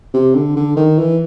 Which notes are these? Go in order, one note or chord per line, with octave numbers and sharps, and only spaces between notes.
C3
D3
D3
D#3
E3